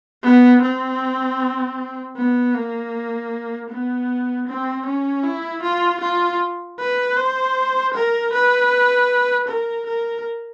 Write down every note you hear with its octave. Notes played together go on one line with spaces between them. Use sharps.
B3
C4
B3
A#3
B3
C4
C#4
E4
F4
F4
B4
C5
A#4
B4
A#4
A#4